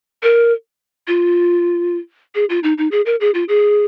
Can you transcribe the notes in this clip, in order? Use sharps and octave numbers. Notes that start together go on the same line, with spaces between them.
A#4
F4
G#4
F4
D#4
D#4
G#4
A#4
G#4
F4
G#4